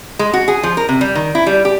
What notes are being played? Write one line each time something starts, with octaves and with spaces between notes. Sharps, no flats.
G#3
F#4
G#4
F3
A#4
C3
G3
D#3
E4
G3
G4